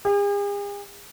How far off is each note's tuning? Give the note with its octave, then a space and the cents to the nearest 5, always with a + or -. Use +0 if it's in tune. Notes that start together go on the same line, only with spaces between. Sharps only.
G#4 -45